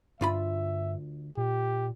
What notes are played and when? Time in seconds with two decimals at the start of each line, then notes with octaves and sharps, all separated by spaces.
0.21 D2 G2 F4 E5 B5
1.37 A#2 G4